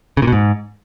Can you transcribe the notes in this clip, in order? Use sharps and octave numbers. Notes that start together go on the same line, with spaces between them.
C#3
A#2
B2
G#2